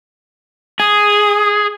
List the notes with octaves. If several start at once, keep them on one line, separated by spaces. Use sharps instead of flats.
G#4 D#6